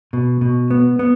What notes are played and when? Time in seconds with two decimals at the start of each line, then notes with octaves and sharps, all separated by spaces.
0.13 B2
0.41 B2
0.71 B3
0.99 B3